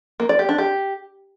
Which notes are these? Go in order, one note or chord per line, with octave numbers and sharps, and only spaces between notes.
A#3
D5
G4
D4
G4